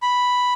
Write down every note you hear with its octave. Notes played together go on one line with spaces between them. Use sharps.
B5